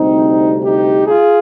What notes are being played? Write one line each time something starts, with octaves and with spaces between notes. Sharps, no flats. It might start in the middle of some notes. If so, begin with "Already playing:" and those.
Already playing: D2 C3 G3 C4 D#4
D#4 G4
F4 G#4